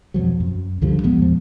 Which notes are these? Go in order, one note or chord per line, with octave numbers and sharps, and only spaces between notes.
F2 B2 F3 F#3
F#2
C#2 D3 F3 G3
A#2 F3 G#3 B3
E2 F3